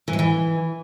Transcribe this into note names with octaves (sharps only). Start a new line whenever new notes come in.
E3
G#3
E3